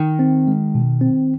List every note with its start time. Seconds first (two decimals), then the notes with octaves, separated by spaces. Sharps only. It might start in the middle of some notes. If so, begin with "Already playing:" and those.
Already playing: D#3
0.19 C4
0.48 G#3
0.75 B2
1.01 C4